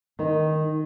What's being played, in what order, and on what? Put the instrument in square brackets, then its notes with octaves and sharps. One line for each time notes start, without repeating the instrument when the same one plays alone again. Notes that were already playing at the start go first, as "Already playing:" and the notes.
[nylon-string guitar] D#3 D#4